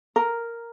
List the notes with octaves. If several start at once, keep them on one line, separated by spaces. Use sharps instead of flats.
A#4